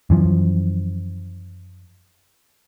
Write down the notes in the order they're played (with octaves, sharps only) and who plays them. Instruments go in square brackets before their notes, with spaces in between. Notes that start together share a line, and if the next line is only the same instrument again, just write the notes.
[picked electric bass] F#2 E3 F3